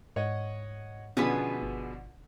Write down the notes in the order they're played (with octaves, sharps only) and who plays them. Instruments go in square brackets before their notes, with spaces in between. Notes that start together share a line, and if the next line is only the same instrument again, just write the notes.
[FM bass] G#2 [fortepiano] C#5 D#5 F#5
[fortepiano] B2 D3 F3 [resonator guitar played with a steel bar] B3 G#4 B4 [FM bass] C#4
[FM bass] G1